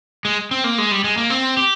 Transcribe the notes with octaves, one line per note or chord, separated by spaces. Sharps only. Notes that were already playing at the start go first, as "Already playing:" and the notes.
G#3
C4
A#3
G#3
G3
G#3
A#3
C4
G4